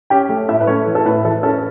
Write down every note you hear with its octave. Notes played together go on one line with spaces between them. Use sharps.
C#4 G4 G5
A3
A2 E4 E5
B4
A3 C#4 C#5
E3
A4
A2 B4
E3 A4
C#4 A4